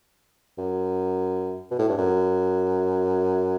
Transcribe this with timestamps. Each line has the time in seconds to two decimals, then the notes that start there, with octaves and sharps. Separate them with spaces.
0.58 F#2
1.71 B2
1.79 A2
1.89 G2
1.97 F#2